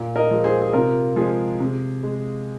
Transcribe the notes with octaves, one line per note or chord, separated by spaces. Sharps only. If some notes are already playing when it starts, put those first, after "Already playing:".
Already playing: A#2
A#4 D#5
F3 G#3
G#4 C5
G#4
C3 F4 A#4
F3 G#3 G#4
C3
G#3